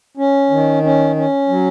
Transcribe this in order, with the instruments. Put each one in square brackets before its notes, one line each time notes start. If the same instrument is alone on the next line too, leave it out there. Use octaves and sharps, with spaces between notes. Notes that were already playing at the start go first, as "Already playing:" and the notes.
[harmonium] C#4
D#3
C#4
C#4
F#3